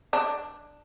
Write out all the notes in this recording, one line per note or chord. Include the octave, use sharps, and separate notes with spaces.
D4